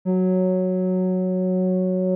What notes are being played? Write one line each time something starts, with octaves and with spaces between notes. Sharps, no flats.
F#3